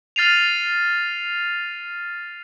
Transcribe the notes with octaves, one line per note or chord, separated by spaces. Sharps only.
F6 A6 C7 D#7 F7